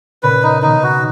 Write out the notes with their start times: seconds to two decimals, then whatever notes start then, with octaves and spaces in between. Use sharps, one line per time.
0.23 A#2 C#3 B4
0.43 D#4
0.62 B2 D#3 D#4
0.83 F#4